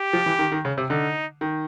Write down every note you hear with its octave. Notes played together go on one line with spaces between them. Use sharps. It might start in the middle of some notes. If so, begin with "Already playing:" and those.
Already playing: G4
F3
E3
D#3
D#3
C#3
C3
D3 D#4
D#3